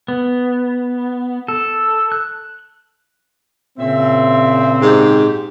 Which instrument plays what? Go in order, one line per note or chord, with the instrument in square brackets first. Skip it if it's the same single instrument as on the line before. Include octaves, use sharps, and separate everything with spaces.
[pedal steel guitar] B3
A4
F#6
[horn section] A#2 C#3 C4 [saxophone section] C#4 G#4 E5
[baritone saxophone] G#2 [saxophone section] G4